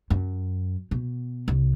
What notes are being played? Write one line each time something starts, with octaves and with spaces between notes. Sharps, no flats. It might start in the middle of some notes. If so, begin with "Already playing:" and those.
F#2
B2
C2